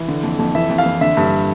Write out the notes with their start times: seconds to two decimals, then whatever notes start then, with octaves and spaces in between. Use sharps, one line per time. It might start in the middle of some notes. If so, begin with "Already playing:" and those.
Already playing: E3
0.08 D3
0.23 F2
0.39 F2
0.55 E3 E5
0.69 F2
0.78 F5
0.86 E3
1.01 D3 E5
1.17 G2